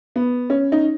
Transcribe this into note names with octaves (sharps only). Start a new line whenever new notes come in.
B3
C#4
D#4